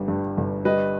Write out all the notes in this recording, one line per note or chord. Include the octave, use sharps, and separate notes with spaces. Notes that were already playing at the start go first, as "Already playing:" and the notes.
Already playing: G1 G3
G2
G1
G3 B4 D#5